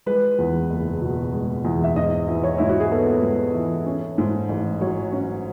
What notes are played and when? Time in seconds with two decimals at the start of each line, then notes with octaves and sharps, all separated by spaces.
0.06 G#3 B4
0.38 E2
0.70 F#1
1.02 B2
1.33 G#3
1.64 E2
1.84 E5
1.96 G#2 D#5
2.28 E3
2.44 C#5
2.58 G#2 E4
2.69 F#4
2.80 G#4
2.91 B3 A4
3.23 G#2
3.54 E3
3.86 C#4
4.18 G#2
4.49 A1
4.81 F#3 C#5
5.12 C#4